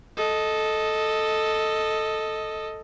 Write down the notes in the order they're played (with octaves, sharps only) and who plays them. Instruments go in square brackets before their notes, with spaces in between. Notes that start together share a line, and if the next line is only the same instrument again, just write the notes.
[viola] A4 D#5